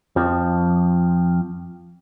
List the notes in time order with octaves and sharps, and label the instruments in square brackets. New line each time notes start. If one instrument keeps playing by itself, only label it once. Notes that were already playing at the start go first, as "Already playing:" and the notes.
[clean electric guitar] F2 F3